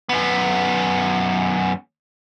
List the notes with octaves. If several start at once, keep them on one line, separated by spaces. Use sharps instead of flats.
F#2 B3